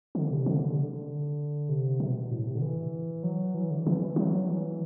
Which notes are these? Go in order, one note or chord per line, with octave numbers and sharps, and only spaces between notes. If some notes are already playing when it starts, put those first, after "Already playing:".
D3
C3
D3
C3
D3
C3
B2
A2
C3
D3
E3
F#3
E3
D3
E3
F#3
E3